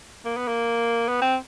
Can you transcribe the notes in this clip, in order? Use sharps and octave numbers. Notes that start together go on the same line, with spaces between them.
A#3
B3
A#3
B3
C4